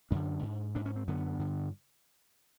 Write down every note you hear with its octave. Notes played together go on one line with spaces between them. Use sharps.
F#2 D3 D4
G#2
G#2 D4
C#4
C4
F#2 D3 B3
G2 D3